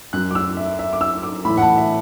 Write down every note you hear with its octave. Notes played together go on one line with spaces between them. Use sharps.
F#2 F#3 F#6
D6
E6
E5
E5
D6
E6
D6
A2 E3 B5
F#5
A5
E5